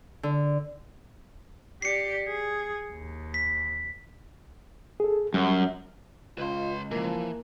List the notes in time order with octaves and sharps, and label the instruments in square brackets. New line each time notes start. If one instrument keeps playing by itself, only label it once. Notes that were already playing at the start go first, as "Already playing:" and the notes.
[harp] D3
[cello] G4 D5 [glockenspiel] C7 C#7
[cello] G#4
D#2
[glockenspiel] B6
[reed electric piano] G#4 A4
[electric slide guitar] F#2 [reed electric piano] G3
[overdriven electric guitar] C#2 [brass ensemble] F4 [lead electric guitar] B4 C6
[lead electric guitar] E3 [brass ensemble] F3 [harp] A#3 C7